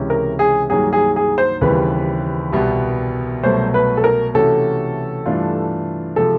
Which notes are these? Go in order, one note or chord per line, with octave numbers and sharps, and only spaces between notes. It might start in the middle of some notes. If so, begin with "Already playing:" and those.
Already playing: C#2 C3 E3 G#3 C#4
A#4
G#4
G2 D#3 F#3 A#3 G#4
G#4
G#4
C5
D#2 C#3 E3 G3 C4 B4
C2 B2 G3 B3
C2 B2 F#3 A3 C5
B4
A4
A#4
C3 E3 A3 C#4 F#4 A4
G2 E3 A3 D4 F4
C3 F3 G#3 A4